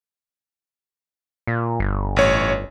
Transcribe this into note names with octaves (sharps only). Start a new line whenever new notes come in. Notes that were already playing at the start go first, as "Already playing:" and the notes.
A#2
G1
A1 C#5